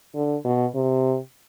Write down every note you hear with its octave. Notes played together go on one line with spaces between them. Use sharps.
D3
B2
C3